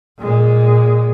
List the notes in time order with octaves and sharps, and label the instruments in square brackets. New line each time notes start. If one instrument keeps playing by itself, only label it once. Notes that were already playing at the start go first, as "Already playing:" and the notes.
[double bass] A#2 G#3